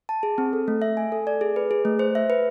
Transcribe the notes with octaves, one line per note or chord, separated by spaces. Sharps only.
A5
G#4
C4
A4
A3
E5
G#5
A4
D5
G#4
B4
G#4
A3
C5
E5
B4